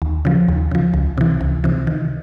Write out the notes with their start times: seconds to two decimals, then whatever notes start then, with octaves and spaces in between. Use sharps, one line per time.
0.02 D#2
0.25 C#3 F3
0.48 D#2
0.71 C#3 F3
0.94 C#2
1.18 C3 E3
1.41 C#2
1.64 C3 E3
1.87 D#3